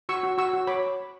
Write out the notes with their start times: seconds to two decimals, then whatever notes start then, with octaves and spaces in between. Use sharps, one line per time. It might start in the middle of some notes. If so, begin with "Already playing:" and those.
0.09 F#4 C#6 E6
0.23 F#4
0.38 F#4 C#6 E6
0.53 F#4
0.67 C#5 B5 D6